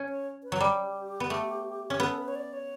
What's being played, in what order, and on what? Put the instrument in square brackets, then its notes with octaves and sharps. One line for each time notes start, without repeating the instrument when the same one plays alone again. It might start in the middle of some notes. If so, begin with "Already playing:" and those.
Already playing: [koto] C#4
[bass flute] C#5
B4
[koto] F#3
[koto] G3 [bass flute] G4
[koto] B3
A3
C#4
[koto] B3 [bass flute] A4
[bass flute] B4
C#5
D5
C#5